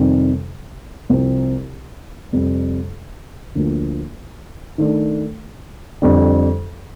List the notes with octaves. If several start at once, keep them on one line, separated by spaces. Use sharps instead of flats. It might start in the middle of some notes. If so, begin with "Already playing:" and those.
Already playing: F2 C3 D#3 G3
C2 C3 F3 C4
F2 C3 G3
D2 D3 F3 A#3
D#3 A3 D4
F2 D3 G3